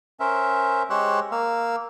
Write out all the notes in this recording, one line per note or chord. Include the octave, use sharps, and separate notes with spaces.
C#4 A#4 C5 E5
G#3 G4 C5 C#5 E6 F#6
A#3 F5 E6